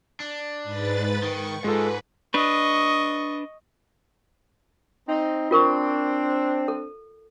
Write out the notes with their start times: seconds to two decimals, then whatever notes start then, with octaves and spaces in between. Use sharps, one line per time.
0.20 D4
0.63 G#2 B4 A6
1.23 D#3 C#6
1.64 G#2 G#3 F4 A4 B4
2.34 D4 B4 D#5 C#6
5.07 C4 D#4
5.51 C4 D4 F4 A#4 C#6
6.68 A4